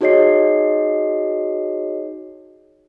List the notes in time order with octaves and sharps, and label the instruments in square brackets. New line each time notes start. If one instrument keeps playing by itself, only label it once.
[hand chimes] D#4 F#4 G#4 C#5 D#5 C7